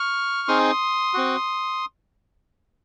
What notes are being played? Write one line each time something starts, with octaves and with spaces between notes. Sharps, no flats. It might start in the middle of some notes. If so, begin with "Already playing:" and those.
Already playing: C#6 F6
C4 D#4 G#4 C6 D#6
C4 F#4